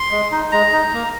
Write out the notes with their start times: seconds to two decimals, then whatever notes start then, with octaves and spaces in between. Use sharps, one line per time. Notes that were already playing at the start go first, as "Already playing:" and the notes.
Already playing: C6
0.11 G#3
0.31 D#4
0.52 G#3 A#5
0.72 D#4
0.93 A#3